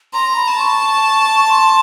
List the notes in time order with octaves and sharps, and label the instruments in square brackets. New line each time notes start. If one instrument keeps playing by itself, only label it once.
[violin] A#5 [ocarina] C6
[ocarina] B5
[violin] A5
[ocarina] C#6
C6